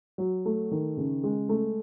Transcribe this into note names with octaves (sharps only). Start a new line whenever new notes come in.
F#3
A3
D#3
C#3
G#3
A3